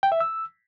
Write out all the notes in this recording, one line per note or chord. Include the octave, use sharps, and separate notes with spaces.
G5
E5
E6